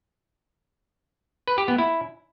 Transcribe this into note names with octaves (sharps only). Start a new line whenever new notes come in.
B4
G4
B3
E4